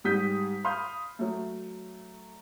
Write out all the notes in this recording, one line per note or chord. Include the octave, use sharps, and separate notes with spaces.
G#2 G3 D#6 G6 B6
F5 B5 C6 D#6 F6 G6
F#3 A3